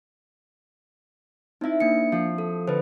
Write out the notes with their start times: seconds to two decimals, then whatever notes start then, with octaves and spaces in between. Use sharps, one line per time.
1.61 C4 D#4 E4 E5
1.80 A#3 D4 C#7
2.12 F3
2.38 A4
2.68 D3 B4 C5